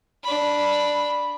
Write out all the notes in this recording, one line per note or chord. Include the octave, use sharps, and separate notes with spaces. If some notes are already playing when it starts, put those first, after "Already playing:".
D4 B5